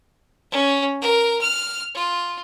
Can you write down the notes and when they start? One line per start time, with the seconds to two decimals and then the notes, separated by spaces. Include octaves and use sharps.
0.51 C#4
1.01 A#4
1.41 F6
1.94 F4